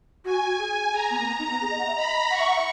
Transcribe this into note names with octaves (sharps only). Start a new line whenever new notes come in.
F#4 G#5
F#4
G#4
G#4 A#5
B3
A#3
B3
D#4
B3
G#4 A#5
D#5
F#5
E5
D#5 B5
F#5 C#6
E5
F#5
E5